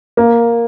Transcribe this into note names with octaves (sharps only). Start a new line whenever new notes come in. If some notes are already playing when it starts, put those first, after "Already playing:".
A#3